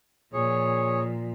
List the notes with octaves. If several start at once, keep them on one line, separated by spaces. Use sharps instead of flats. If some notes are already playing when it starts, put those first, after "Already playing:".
A#2 F3 G#4 C#5